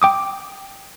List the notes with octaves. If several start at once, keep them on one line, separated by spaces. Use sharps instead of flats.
G5 D6 D#6